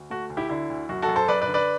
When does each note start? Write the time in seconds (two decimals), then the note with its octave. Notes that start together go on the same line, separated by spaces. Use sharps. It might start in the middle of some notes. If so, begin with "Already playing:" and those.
Already playing: D2
0.10 A3 F#4
0.30 D2
0.37 E4 G4
0.49 D3 E4
0.70 D2
0.89 F#2 F#4
1.02 F#4 A4
1.08 F#2
1.16 A4 C5
1.28 F#2 B4 D5
1.41 B4 D5
1.47 D3
1.54 B4 D5